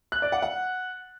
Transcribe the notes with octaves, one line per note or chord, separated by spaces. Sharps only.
F#6
D5
F#5
F#5